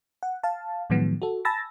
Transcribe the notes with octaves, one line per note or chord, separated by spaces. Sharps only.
F#5
F5 A5
A2 D#3 F3 F#3 G#3 B3
F#4 A4
G#5 A5 B5 E6 A6 A#6